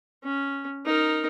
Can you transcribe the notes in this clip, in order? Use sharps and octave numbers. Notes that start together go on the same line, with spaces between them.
C#4
D#4 A#4